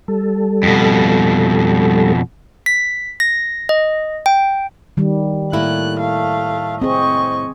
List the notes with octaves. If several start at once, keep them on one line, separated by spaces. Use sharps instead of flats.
G3 A4
F2 B2
B6
A#6
D#5
G5
D#3 G3
A2 A#3 E4 F#6
A3 F5
C4 G#4 D#5 C#6